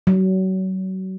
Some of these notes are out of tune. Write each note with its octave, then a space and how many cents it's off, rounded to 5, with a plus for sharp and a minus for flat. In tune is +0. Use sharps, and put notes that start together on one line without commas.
F#3 +30